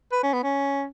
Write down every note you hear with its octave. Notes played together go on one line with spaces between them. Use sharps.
B4
C#4
B3
C#4